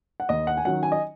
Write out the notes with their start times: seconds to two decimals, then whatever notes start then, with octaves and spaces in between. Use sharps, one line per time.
0.20 F#5
0.29 D#2 D#5
0.47 F#5
0.57 G#5
0.65 D#3 F#3 C#4 F#5
0.83 G#5
0.92 D#5